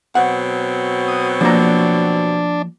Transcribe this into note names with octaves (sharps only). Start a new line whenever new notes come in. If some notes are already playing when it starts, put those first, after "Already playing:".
B2 F#3 C4 F#5
D#6
F3 A#3 D4 A#5